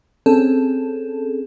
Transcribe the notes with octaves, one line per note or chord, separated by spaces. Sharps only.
C4 C#4 G#4 A4